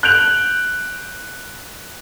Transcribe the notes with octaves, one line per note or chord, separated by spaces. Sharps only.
F#6 G6 D7 F7